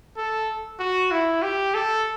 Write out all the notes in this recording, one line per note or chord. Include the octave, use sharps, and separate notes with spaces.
A4
F#4
E4
G4
A4